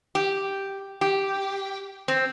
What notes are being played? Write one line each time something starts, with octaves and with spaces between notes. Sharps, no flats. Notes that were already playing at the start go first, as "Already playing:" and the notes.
G4
G4
C4